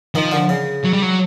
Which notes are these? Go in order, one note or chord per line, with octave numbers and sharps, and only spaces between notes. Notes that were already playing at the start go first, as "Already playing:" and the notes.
D#3 F3
D3
C#3
F#3
G3
F#3